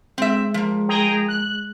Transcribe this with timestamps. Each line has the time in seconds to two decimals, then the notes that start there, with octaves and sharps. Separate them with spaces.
0.18 G#3 C4 E5
0.54 F3 A#3
0.89 G#4 G5 A#5
1.28 F#6